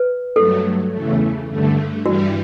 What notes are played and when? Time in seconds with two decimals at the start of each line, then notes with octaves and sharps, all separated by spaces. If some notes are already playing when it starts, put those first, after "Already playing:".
Already playing: B4
0.36 G2 F#3 A3 A4
0.92 E2 C#3 E3 A3
1.48 G2 D3 A3
2.05 G2 E3 G3 F#4